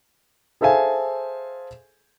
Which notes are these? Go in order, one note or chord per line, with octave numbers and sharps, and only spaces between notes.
G#4 A4 C5 E5 F5 G#5